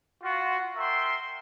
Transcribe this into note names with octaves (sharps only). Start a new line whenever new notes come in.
F4 F#4
A#4 E5 G5 C6